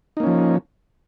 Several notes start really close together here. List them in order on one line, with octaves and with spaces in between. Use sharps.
D#4 A#3 C#4 F3